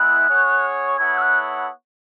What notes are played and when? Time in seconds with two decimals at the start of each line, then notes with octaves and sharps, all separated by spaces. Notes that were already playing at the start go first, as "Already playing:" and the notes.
Already playing: G#3 B3 E4 F#6
0.27 C#4 G#4 C#5 F#5
0.98 B3 E4 A4 C#5 F#5 G#6
1.18 E6
1.22 F#6